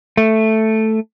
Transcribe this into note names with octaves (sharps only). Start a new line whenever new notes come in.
A3